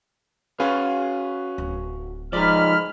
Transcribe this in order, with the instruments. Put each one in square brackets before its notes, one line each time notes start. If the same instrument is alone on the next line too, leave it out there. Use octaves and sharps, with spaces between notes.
[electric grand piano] C#4 G#4 B4 [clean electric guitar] F#4 F5
[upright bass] D1
[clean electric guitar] F3 D#4 [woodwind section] G#3 B5 F6 [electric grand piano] D5